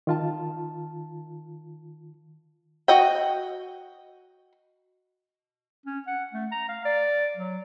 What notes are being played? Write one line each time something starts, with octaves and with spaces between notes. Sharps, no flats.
D#3 F4 A5
F#4 D#5 G5
C#4
F#5
A3
A#5
F5
D5
F#3